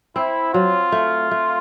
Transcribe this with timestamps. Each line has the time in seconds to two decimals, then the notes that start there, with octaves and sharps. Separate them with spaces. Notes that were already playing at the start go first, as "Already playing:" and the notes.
0.16 C4 E4
0.54 F#3 F4
0.92 A3
1.31 A3